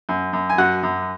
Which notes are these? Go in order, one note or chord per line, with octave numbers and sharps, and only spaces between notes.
F#2
F#2
G#5
F#2 F#4 F#5
F#2